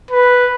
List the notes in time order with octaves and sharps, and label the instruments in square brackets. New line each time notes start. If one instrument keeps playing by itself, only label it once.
[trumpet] B4